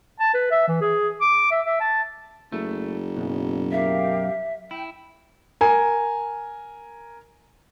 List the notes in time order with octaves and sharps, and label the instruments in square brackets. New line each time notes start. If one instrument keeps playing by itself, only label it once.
[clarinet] A5
B4
E5
E3
G#4
D6
E5
E5
A5
[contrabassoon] F#1 [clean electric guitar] A3
[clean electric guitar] B1 F#2
[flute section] G4 A#4 F5 [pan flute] E5
[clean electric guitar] E4 [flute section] G5
[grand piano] A#4 G#5